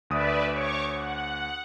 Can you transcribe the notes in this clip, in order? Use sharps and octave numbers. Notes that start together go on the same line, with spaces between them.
D2 B4 D5 E5 D#6
C#5 C#6 D6
F#5